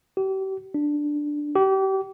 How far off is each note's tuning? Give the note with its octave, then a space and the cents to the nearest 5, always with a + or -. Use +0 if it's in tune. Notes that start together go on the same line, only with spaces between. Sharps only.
G4 -35
D4 +5
G4 -30